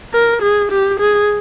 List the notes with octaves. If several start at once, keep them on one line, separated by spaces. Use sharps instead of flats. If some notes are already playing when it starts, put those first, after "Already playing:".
A#4
G#4
G4
G#4